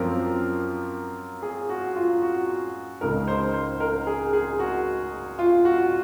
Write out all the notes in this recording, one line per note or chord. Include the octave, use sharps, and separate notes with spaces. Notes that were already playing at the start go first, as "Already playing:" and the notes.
Already playing: F#2 F3 C4 F4 A#4
G#4
F#4
F4
F#4
C#2 C#3 G#3 D#4 A#4
C5
C5
A#4
G#4
G#4
F#4
F4
F#4